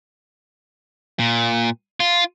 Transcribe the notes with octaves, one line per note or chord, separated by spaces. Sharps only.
A#2
F4